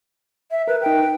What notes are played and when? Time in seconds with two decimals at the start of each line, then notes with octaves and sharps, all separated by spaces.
0.51 E5
0.68 A#4 B4
0.82 D#4 A#4 G5